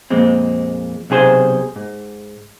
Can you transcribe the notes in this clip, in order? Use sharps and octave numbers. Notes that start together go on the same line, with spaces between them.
F2 A#2 G#3 C4
B1 C3 G#4 C5
G#2